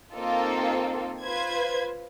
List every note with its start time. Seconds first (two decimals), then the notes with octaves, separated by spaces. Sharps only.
0.12 A#3 C4 D#4 F4 A4
1.23 F4 B4 C5 G#6